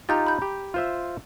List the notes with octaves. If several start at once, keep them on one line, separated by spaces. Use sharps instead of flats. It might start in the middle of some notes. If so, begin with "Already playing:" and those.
D#4 F4 G4 A#5 G6 A6
B5 G6
G4
F4 C5 E5